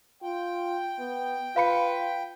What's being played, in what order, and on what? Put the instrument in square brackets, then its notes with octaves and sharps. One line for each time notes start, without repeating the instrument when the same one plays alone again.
[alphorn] F4 [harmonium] G5
[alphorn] B3
[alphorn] F4 [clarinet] B4 [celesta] F5 B5 C#7